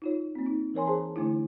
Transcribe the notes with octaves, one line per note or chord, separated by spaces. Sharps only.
D#4 F4 C#5
A#3 C4
D#4
E3 A#4 C#5 G#5 C6
G#4 C5 C#5 A5 A#5 C6
D3 A3 D4 E4